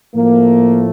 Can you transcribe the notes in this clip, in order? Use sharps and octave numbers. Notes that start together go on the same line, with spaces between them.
A2 F3 A3 A#3